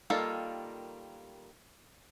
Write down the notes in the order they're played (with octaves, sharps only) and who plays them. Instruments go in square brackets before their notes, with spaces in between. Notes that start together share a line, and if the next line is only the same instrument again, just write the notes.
[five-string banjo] D#3 G3 A#3 F4 A4